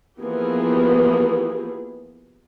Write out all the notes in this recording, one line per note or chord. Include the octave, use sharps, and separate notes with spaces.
E3 F3 A#3 B3 G4 G#4